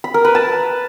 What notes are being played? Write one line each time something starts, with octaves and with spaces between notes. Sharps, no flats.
B5
A#4
B4
A5